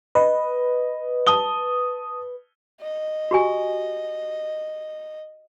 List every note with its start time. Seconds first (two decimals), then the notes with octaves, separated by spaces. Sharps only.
0.15 B4 D#5
1.27 A5 D#6 G7
2.81 D#5
3.31 F#4 G4 G#5